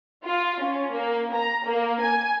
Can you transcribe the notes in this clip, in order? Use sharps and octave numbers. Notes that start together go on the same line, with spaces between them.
F4
C#4
A#3
A#5
A#3
G#5